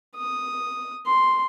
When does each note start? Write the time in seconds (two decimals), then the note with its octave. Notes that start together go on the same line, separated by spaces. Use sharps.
0.16 D#6
1.06 C6